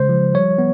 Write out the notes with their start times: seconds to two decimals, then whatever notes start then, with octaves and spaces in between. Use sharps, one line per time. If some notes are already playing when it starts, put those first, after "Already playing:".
Already playing: C#3 G#3 C5
0.09 F3
0.34 G3 C#5
0.58 B3